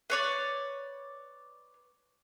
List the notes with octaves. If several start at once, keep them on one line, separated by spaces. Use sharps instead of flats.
B4 C#5 D5